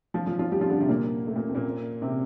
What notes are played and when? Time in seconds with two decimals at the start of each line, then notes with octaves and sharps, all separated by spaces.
0.14 F3 F4
0.26 F3 F4
0.39 F3 F4
0.51 G3 G4
0.61 F3 F4
0.70 D3 D4
0.80 C3 C4
0.89 A#2 A#3
1.27 A3
1.36 A#2 A#3
1.48 C4
1.55 A#2 A#3
2.01 C3 C4